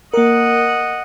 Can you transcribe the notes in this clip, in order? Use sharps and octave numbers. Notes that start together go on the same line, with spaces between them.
A#3 A#4 D#5 F#5